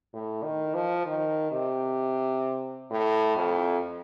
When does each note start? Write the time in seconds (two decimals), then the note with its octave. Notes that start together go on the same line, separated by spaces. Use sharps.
0.13 A2
0.43 D#3
0.74 F3
1.06 D#3
1.51 C3
2.91 A2
3.36 F2